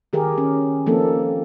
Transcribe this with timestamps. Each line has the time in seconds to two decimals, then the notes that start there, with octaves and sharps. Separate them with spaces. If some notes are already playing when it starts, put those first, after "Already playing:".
0.13 D#3 G4 G#4 A#4
0.38 C#4
0.86 F3 A#3 C4 D#4 A4